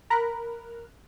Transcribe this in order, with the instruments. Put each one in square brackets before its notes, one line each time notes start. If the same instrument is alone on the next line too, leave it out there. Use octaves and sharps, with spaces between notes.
[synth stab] A#4 A#5 B5 F#6